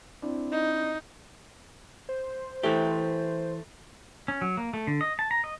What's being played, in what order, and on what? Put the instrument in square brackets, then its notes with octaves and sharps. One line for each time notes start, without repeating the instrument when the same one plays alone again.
[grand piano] C4 D4 E4
[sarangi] D#4
[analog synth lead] C5
[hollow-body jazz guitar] E3 G4 [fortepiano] A3
[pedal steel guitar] C#4
F#3
A#3
A3
D3
D#5
A5
A#5
D#5